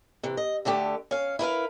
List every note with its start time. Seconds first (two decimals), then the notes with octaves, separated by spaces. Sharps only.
0.23 C3 E3
0.37 D#5
0.65 D2 D3 A3 G4
1.11 C#4 F5
1.39 E4 A#4 B4 F5